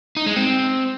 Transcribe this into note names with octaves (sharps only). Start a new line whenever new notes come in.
D#4
G#3
C4